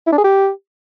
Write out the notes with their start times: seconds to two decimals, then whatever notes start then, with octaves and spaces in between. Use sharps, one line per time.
0.06 E4
0.12 D4
0.18 G#4
0.24 G4